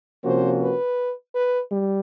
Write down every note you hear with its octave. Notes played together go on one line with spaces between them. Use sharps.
C3 F3 A#3 C#4 F#4 C5
B4
B4
G3